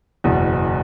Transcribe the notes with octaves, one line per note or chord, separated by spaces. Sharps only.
F#1 E2 B2